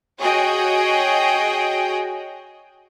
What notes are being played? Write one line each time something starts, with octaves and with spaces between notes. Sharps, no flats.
F#4 G#4 C#5 D#5 G5